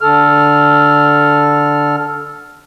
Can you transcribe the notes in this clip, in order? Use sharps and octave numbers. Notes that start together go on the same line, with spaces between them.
D3 A4 F6